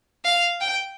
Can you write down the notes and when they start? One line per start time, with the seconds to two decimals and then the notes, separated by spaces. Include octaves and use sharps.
0.25 F5
0.61 G5